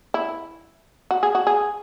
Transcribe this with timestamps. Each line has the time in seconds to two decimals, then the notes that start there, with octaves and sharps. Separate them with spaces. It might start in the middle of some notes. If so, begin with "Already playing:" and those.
0.14 E4
1.11 F#4
1.23 G#4
1.35 F#4
1.47 G#4